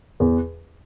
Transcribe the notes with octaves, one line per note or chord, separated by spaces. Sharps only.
E2